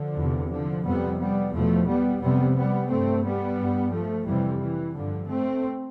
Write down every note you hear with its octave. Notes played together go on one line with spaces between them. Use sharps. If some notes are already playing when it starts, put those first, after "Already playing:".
Already playing: D3 F3
E2 C3
D3 F3
F2 C3 G3 B3
G3 B3
E2 B2 F3 A3
G3 B3
F2 C3 G3 B3
G3 B3
G2 A3 C4
G3 B3
G2
F3 A3
F2 C3 E3 G3
E3
G2 D3 F3
A3 C4